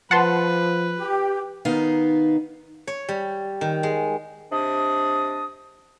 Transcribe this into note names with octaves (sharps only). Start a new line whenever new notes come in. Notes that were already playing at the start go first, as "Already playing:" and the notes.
F3 B4 F#5 A5 C6
G4
D#3 B3 D#4 F5
C#5
G3
D#3
G#3
C3 D4 D#5 D#6